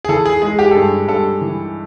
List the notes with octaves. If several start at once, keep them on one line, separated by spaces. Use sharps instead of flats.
G#4
E3 A4
G#4
G#3 G#4
G4
A4
G2 G#4
G2 A4
E3